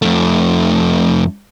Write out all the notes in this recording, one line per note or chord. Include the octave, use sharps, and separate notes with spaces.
F2 A3